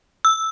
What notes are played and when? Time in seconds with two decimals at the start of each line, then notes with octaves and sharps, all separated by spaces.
0.25 E6